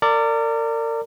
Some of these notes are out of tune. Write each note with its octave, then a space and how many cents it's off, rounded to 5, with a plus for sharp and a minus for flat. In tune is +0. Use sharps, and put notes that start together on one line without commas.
A#4 -35 D5 +0